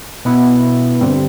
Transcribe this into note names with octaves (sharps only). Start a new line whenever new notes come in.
B2 B3 E4
G2 D3 G3 C4